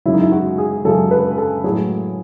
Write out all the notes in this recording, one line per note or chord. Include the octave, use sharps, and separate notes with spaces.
F#2 C#3 F#3 E4
D#4
E4
F#4
G#4
F#2 C#3 F#3 A4
B4
A4
A2 F#3 G#4